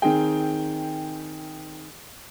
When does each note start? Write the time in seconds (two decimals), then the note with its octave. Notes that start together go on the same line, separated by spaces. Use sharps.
0.02 D#3 C4 G#4 G5